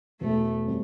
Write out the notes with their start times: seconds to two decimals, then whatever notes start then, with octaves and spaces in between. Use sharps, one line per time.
0.21 E1 A3
0.67 G3 C4